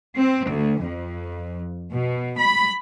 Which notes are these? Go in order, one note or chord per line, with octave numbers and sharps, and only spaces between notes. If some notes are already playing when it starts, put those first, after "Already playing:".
C4
D2
F2
B2
B5